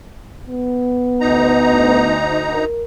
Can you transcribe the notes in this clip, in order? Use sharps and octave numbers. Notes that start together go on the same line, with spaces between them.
B3
D2 D#4 A#5
A#4